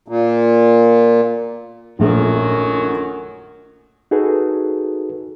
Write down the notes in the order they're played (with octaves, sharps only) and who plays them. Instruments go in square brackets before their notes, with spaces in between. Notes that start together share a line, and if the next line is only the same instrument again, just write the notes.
[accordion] A#2
[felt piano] A#1 A3 A4 [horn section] F#2 D#3 F#3
[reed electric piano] D#4 F#4 G#4 A4 B4